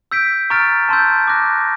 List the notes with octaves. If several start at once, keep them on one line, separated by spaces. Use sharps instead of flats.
E6 G6 B6 D7
A#5 C#6 F6 A6 D7
A5 C6 E6 G6
D6 F#6 A#6